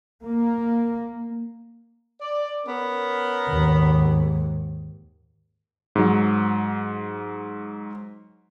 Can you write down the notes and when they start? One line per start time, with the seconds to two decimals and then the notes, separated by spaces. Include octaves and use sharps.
0.23 A#3
2.21 D5
2.65 B3 C#4 A#4
3.49 D#2 G#2
5.95 G#2 F#3